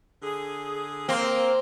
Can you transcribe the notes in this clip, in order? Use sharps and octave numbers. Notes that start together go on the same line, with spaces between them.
D3 G#4
A#3 C4